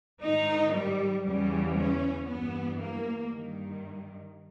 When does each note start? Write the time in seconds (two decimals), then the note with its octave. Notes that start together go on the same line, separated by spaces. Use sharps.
0.23 G#2 D#3 D#4
0.74 G3
1.26 E2 C#3 E3 G3
1.78 C#4
2.28 G2 E3 B3
2.80 A#3
3.33 G2 D#3